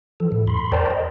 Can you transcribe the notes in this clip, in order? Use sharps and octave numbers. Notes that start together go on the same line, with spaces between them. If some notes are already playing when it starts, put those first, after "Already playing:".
E3 F3 A4
A2
E2 B5 C6
A#4 C5 D5 G5 A5 A#5
D#5